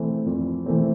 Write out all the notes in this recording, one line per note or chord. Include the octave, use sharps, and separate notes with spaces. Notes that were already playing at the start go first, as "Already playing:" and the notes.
Already playing: E3 A3 C4
F2
E3 A3 C4